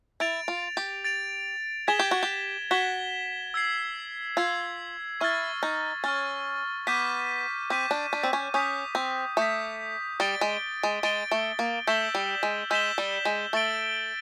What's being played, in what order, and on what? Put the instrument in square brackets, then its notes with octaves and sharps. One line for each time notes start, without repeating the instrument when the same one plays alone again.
[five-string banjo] E4 [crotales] A6 D7 F7
[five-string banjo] F4
G4
[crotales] A6 D7 F7
[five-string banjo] G#4 [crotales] G#6 B6 E7 G7
[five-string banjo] G4
F#4
G4
[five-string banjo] F#4 [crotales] G#6 B6 E7 G7
[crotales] E6 G#6 C7
[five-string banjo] F4 [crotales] E6 G#6 C7
[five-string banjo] E4 [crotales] C#6 F6 A6
[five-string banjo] D#4
[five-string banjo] C#4 [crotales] C#6 F6 A6
[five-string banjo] B3 [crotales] D6 G6 B6 D#7
[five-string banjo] C4 [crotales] D6 G6 B6 D#7
[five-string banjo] D4
D4
C4
C#4
[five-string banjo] C#4 [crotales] D#6 G6 B6
[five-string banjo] C4
[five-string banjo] A3 [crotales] D#6 G6 B6
[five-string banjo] G3 [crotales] A6 D7 G7
[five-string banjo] G#3
G#3
[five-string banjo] G#3 [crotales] A6 D7 G7
[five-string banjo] A3
A#3
[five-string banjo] A3 [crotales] E6 G6 B6 E7 G7
[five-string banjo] G3
G#3
[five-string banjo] G#3 [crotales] E6 G6 B6 E7 G7
[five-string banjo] G3
G#3
[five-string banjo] A3 [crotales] E6 A6 D7 G7